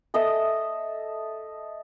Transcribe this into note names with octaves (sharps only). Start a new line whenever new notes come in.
A4 D#5 E5 D#6